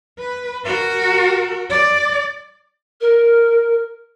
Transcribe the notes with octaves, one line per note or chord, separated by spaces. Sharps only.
B4
F#4 A#4
D5
A#4